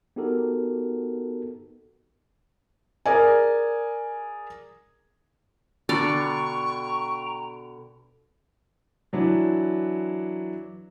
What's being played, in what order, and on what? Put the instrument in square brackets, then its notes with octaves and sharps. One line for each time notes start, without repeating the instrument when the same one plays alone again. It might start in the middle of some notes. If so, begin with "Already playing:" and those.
[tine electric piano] B3 D#4 F#4 G4 A4 A#4
[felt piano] G#4 A#4 D5 G#5
[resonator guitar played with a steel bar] B2 D3 [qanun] D5 [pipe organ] G5 A#5 [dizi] C#6
[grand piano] E3 F#3 D4 E4